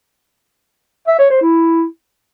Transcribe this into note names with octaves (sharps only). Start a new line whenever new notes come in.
E5
C#5
C5
E4